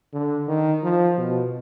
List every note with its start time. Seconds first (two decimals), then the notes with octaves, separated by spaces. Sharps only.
0.13 D3
0.48 D#3
0.83 F3
1.18 B2